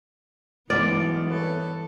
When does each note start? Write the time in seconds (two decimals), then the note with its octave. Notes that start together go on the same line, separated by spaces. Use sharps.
0.70 B1 G2 E3 G#3 B3 D5 F6
1.31 A4 B4 C#5